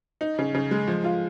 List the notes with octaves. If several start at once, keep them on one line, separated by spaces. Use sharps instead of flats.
D#4
C#3
C#3
G#3
F3
F4